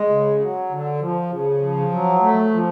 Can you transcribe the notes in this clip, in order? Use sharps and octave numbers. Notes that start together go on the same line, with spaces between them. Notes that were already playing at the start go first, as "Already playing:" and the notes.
Already playing: G#3
C#3
F#3
D3
F3
C#3
F3
F#3
A3
F3